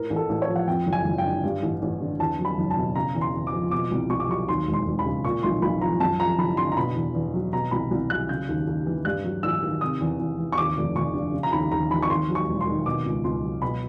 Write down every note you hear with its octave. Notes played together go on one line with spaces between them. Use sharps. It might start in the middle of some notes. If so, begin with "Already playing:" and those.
Already playing: A2 A#4
A1
A4
A1
C#5
F3
F#5
F2 G5
F#1
G#5
F#1
G5
D3
G2
A1
A1
D3
E2 A5
F#3
B5
F#1
A5
B2
C#3 A#5
E2
C6
E2
D6
F3
B2 D6
C2
C2 C#6
D6
F#3 C#6
D#2 C6
E1
C6
E1
B5
C#3
A#2 C#6
B1 C6
B1 B5
F3 A#5
F#2 A5
F3 A#5
F#1 B5
D3 C6
A#5
B2 B5
E2
E2
F#3
B2 A#5
C2 B5
C2
F#3 F#6
C#3 G6
D#2
D#2
E3
G2 F#6
F#3
A1 E6
D#3
C3 D#6
E2
E2
E3
C#6
D#2 D6
F1
F1 C#6
D3
C#3
A#5
D#2 B5
D#2 A#5
E3 B5
C#6
D#2 C6
F#3
C#6
E1
C6
D#3
B2 D6
C#2
C#2 C6
F#3
B2 B5